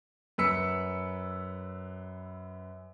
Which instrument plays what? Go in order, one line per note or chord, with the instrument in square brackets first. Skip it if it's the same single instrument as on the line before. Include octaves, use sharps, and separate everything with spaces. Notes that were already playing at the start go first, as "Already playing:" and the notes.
[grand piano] F#2 B4 B5 E6 B6 C#7